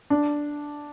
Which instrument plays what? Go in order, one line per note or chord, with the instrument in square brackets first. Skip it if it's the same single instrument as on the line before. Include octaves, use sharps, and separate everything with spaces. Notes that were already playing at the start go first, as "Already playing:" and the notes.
[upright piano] D4